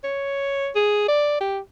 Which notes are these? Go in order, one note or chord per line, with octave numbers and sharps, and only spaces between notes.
C#5
G#4
D5
G4